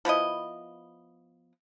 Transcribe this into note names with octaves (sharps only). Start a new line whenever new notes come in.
F3 B3 E4 D#5